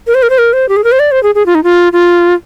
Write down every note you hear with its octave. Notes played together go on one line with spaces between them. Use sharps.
A#4
C5
A#4
C5
A#4
C5
G4
G#4
A#4
C5
D5
C5
G#4
G#4
F4
D#4
F4
F4